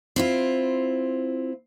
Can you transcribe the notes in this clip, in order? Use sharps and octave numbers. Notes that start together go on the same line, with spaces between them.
C4 E4 F4